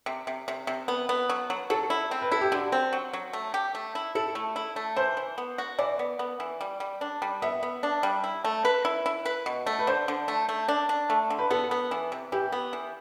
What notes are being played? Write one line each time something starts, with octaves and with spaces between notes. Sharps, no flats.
C3
C3
C3
C3
B3
B3
F#3
F#3
F#3 A4
E4
C4
B4
E4 A4
G4
D3 F#4
C4
F#3
F#3
A3
G4
A3
E4
E4 A4
A3
E4
A3
E3 C5
E3
B3
F#4
E3 D5
B3
B3
E3
G3
G3
D4
G3
B3 E5
B3
D4
G3
E4
A3
B4
E4
E4
B4
B2
A3
B4
D3 C5
D3
A3
A3
D4
D4
A3
D3
B4
B3 A4
B3
E3
C3
E3 G4
B3
E3